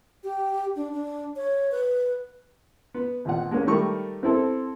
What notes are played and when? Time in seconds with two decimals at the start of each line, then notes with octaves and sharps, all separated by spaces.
0.24 G4
0.76 D4
0.92 D4
1.36 C#5
1.71 B4
2.94 B3
3.25 G#1 A#2 F#5
3.51 G#3 A#3 C#4 A#4
3.67 D#3 G3 A3 A#4 C#6
4.23 C4 E4 A4